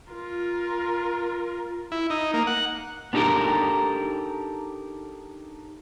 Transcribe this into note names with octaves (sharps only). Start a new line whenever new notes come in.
F4 A#4
E4
D#4
A#3
F#5
B3 D4 D#4 G4 A4 A#4